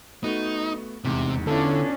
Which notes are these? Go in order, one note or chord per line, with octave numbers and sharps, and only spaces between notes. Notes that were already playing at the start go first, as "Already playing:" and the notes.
A3 B3 D#4 F#4
F1 E2 G#2 C3
D3 B3 C#4 D4 E4 F4 A4